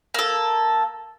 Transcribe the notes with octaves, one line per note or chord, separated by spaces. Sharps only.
A#3 A4